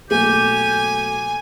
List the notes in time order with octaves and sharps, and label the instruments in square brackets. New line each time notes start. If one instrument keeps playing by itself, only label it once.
[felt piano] B1 A3 A#3 [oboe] G4 [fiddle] G#5